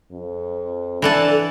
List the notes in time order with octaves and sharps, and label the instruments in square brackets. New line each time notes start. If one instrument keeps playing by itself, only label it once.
[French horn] F2
[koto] E3 F#5 A5 [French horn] D4 [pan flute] A4